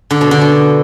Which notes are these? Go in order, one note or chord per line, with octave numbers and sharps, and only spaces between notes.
D3
B2
D3
B2